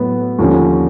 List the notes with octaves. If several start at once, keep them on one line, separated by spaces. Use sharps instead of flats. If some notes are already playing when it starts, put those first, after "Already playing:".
Already playing: A2 F#3 B3
D#2 D3 F3 A3 C#4